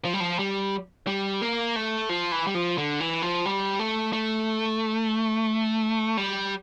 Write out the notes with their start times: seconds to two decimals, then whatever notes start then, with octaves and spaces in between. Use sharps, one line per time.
0.05 F3
0.14 G3
0.20 F3
0.39 G3
1.07 G3
1.42 A#3
1.76 A3
2.09 F3
2.32 E3
2.47 G3
2.55 F3
2.78 D3
3.00 E3
3.22 F3
3.46 G3
3.79 A3
4.13 A3
6.17 G3